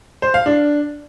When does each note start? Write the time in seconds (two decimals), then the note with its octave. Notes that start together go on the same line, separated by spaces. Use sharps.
0.22 C5
0.34 F5
0.46 D4